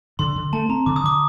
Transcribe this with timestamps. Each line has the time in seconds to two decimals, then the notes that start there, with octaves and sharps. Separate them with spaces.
0.19 D3 C6
0.36 D3
0.53 A3 A5
0.69 C4 A#5
0.86 D3 D6
0.96 D#6
1.04 D3 D6